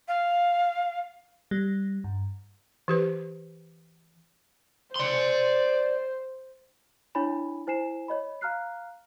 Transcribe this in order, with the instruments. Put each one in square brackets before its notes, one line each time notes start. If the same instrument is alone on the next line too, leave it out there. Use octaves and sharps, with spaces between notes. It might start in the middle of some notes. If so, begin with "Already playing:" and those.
[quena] F5
[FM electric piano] G3
G2
[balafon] E3 G4 B4
[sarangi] C5 [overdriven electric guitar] D5 C6
[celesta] D4 E4 C#5 G#5 B5
E4 C5 G#5 C7 E7
C#5 D#5 B5
F5 A#5 F6 F#6 C7